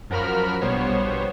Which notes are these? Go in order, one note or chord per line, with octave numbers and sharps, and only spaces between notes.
F#2 F3 F#4 A#4 B5 F6
A#1 B2 G3 B3 C5 C#5